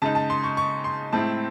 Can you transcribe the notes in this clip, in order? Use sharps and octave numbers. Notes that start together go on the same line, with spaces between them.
C#3 G#3 D#4 A5
A5
C6
C#6
C#6
C6
A2 G#3 C4 E4 A5